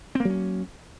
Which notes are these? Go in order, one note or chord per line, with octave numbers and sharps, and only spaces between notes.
F#3 A#3 C4 C#4